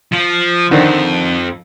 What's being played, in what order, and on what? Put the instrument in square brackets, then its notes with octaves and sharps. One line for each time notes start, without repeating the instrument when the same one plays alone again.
[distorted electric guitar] F3
[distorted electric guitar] F2 [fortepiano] D3 D#3 C4